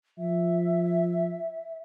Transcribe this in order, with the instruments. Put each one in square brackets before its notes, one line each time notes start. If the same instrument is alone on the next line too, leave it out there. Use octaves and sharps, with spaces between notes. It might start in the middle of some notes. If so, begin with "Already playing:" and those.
[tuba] F3 [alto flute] E5